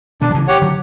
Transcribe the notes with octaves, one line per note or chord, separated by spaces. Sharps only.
B2 D3 D4
F#3
C#3 E3
G4 C#5 F#5
D3 F#3